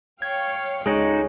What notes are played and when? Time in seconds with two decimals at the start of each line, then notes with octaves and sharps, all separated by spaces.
0.22 C#5 F5 G5 G#6
0.86 C#2 D3 G#3 D#4 F#4 G#4 C#5